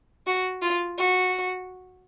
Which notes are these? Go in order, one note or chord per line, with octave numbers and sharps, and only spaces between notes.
F#4
F4
F#4